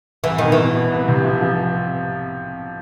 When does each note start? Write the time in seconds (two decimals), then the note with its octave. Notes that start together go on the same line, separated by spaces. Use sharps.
0.24 C2 E3
0.38 B2 D#3
0.52 E3
0.57 B2
0.74 B2
0.91 C2
1.08 C3
1.24 F3
1.41 F3